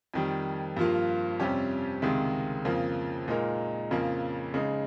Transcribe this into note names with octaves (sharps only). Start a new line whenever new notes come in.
F2 D#3 G3
G2 F3 A#3 F4
F2 C3 G3 C#4 G4
C#2 C3 D#3 G#3
F2 C#3 F3 A#3
A#2 G#3 D#4 A#4
F2 C#3 F3 A#3
C#3 G#3 D#4